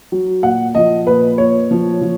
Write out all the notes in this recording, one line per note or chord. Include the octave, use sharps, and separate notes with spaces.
F#3
A#2 F#5
F3 D#5
A#2 B4
A#2 C#5
F3
F3